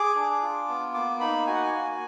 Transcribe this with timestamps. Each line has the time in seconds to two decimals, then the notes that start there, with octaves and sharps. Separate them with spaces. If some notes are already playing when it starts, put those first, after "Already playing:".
Already playing: G#4 D6
0.15 D4
0.42 F4
0.69 B3
0.94 A#3 D6
1.20 D#4 B5
1.47 F#4 G#5
1.54 F#5
1.62 G#5
1.73 A#3